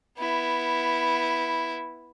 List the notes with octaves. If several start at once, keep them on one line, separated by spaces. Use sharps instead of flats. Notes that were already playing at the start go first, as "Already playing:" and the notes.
B3 E4